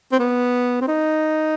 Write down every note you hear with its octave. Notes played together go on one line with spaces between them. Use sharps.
C4
B3
C4
D#4